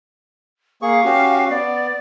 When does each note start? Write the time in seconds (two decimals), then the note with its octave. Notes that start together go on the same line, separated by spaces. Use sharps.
0.82 A#3 G#4 F5 C#6
1.05 C#4 F#4 G4
1.49 B3 D5